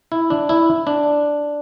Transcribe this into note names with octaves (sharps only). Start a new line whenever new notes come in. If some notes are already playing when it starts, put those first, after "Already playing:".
E4
D4
E4
D4